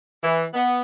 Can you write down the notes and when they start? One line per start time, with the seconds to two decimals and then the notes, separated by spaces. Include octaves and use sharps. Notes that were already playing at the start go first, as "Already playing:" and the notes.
0.24 E3
0.54 B3